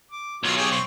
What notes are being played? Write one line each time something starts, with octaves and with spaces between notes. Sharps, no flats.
D6
B1 D#3 F4 F#4
G4 G#4 C#5
C4 C6 C#6